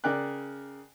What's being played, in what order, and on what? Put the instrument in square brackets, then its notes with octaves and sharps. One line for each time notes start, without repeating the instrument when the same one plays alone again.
[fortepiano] C#3 A#4 D5 G5 F#6